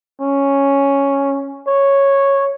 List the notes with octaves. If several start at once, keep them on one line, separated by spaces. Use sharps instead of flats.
C#4
C#5